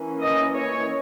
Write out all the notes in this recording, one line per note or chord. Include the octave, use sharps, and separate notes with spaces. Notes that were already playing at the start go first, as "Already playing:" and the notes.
Already playing: E3 A#3 C#4
D#5
C#5